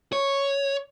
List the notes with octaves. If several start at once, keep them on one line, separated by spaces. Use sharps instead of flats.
C#5